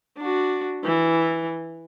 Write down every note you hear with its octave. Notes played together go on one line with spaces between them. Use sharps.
D4 F#4
E3